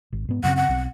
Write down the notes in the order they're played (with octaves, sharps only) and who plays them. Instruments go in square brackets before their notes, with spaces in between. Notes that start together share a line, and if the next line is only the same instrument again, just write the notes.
[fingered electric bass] G#1
G#2 B3
[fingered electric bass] F#2 C#3 C4 [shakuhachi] F#5
[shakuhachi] F#5
[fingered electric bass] B1 C4